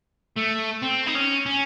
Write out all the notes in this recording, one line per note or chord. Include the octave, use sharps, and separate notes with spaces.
A3
C4
D#4
C#4
C#4